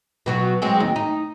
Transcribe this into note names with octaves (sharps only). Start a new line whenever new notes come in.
B2 F#3 F#4
F#3 G#3 C4
D#2
D#4